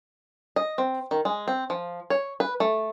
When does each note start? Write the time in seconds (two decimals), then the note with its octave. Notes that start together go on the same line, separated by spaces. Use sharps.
0.56 D#5
0.78 C4
1.11 D#3
1.25 G#3
1.48 C4
1.70 F3
2.10 C#5
2.40 B4
2.60 A3